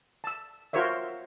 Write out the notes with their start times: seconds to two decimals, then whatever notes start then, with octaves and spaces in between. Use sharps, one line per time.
0.24 A5 E6
0.73 F4 F#4 A#4 C5 C#5 E5